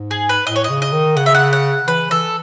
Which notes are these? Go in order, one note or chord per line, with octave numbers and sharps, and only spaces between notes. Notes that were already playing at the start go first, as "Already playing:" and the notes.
Already playing: G#2
G#4
B4
A2 D#5
C#5
D#5
C#3
D#5
D#3
C#3 F#5
E5
F#5
F#5
E3 B4
E3 A4